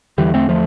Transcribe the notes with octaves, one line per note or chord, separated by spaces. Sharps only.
E2 D3 E3 G3
A3 C4
F3 A3